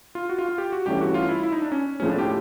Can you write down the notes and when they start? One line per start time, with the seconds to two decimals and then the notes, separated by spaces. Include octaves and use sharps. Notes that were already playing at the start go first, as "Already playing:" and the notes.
0.15 F4
0.29 F#4
0.39 F4
0.49 F4
0.58 G4
0.72 F#4
0.86 G2 E3 A3 C#4 G4
1.01 F#4
1.14 F4
1.29 E4
1.43 E4
1.52 D#4
1.62 D4
1.72 C#4
2.00 A2 F3 G#3 C#4
2.09 D4
2.18 G4